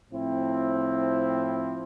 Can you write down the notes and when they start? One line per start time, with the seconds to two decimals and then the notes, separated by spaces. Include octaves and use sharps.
0.10 A2 F3 C4 E4